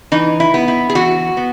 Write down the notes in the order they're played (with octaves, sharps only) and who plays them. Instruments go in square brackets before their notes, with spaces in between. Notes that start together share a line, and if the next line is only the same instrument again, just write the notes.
[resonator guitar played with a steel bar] E3 D#4
E4
B3
E4
G#4
E3 F#4
B3